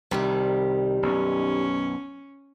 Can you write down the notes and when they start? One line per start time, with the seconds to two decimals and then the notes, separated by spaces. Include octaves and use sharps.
0.11 C2 F2 D#3 G3
1.03 B1 F#2 C#4